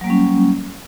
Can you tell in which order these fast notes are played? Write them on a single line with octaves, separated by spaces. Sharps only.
F#3 A#3 G3 C#4